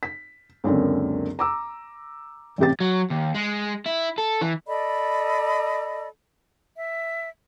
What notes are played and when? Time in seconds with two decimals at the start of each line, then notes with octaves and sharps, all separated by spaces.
0.03 B6
0.64 C#2 F#2 D3 A#3 C4
1.39 A#5 D6 E6
2.58 A1 C3 G4 A6
2.80 F#3
3.10 D#2
3.35 G#3
3.86 E4
4.18 A4
4.41 E3
4.67 A4 D5 D#5 B5
6.77 E5